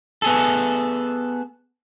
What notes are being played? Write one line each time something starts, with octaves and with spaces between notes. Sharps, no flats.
B3 G#4 A4